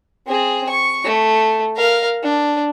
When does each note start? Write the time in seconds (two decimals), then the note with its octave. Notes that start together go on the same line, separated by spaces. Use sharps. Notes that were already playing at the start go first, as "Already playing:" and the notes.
0.27 C4 G#4
0.69 C#6
1.04 A3
1.76 A#4 F5
2.23 D4